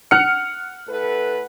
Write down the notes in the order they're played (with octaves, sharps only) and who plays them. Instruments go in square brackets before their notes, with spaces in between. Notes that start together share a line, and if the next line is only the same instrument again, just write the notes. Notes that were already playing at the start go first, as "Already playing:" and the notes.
[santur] F#5 [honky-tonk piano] F6 C#7
[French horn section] A2 A4 B4